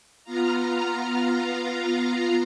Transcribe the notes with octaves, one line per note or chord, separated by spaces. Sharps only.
B3 F4 F5 A#5